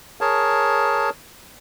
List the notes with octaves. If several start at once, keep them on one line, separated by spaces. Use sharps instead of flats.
G#4 A#4 C#5 A5